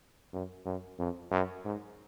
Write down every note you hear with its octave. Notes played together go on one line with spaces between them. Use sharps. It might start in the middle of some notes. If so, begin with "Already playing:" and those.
F#2
F#2
F2
F#2
G#2